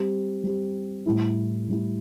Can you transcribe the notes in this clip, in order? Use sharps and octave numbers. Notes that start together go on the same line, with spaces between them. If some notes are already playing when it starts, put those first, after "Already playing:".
Already playing: G3 C4 G4
G3 C4 G4
A2 G3 E4
A2 G3 E4